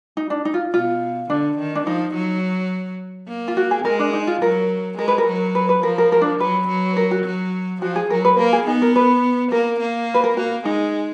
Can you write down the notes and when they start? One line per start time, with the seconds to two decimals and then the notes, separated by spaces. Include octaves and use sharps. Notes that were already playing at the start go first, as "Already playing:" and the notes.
0.17 D#4
0.30 D4
0.45 D#4
0.54 F4
0.74 B2 F4
1.30 D3 D4
1.58 D#3
1.75 D4
1.87 F3 D#4
2.15 F#3
3.28 A#3
3.48 F4
3.57 F#4
3.71 G#4
3.85 G#3 A#4
3.99 D4
4.13 D#4
4.27 F4
4.42 F#3 A#4
4.99 G#3 A#4
5.08 B4
5.18 A#4
5.27 F#3
5.55 B4
5.69 B4
5.83 F3 A#4
5.98 A#4
6.12 A#4
6.21 D4
6.40 F#3 B4
6.68 F#3
6.97 A#4
7.11 F#4
7.25 F#3
7.82 F3 F#4
7.96 G#4
8.10 F#3 A#4
8.25 B4
8.38 A#3 A#4
8.53 G#4
8.67 B3 D#4
8.82 A#4
8.96 B4
9.52 A#3 A#4
9.81 A#3
10.14 B4
10.24 A#4
10.37 A#3 F#4
10.65 G#3 D#4